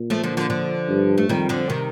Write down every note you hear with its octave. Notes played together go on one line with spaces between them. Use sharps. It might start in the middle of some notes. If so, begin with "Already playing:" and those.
Already playing: A#2
F3 A3
D3 F3
D3 F3
D3 F3
G2
A3
F2 D#3 G3
D3 F3
C3 D#3